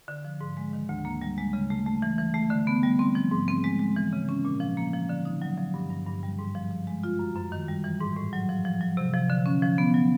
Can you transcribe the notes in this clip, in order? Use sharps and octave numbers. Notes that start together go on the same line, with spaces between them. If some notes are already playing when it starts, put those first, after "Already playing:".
D3
F3
G#2
G#3
D#3
D2
A#3
G3
G#3
C#3
A3
A3
E3
E3
A3
D3
B3
G3
C4
F3
G#2
C4
G#3
G#3
E3
C#3
C#4
A#2
F3
A#3
F3
D3
D#4
F#3
F3
G2
G2
G2
G3
G#2
F3
F3
G#3
F4
F#2
F#2
D#3
G3
E3
G#2
A2
F#3
F3
F3
F#3
C3
F3
D3
C#4
F3
B3
F#3